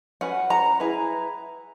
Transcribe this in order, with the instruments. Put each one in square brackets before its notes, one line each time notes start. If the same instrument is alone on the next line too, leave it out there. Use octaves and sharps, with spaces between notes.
[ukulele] C#4 F#4 B4 F#5
A#5
E4 G#4 B4 A#5